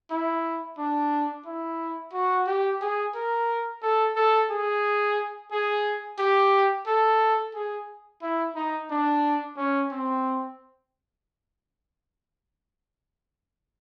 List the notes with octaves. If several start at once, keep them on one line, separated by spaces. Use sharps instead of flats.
E4
D4
E4
F#4
G4
G#4
A#4
A4
A4
G#4
G#4
G4
A4
G#4
E4
D#4
D4
C#4
C4